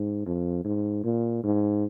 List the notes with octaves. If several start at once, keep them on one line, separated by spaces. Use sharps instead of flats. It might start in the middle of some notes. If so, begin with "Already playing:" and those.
Already playing: G#2
F2
G#2
A#2
G#2